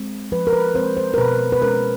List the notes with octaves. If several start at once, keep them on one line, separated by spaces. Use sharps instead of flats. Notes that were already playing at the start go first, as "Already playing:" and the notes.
Already playing: G#3 C4
F3 B4
A#4
B4
G#3 C4 C5
C5
A#4
B2 B4
B4
G#3 C#4 A#4